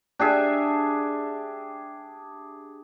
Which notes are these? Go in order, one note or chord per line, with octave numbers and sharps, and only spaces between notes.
D4 G4 G#4 E5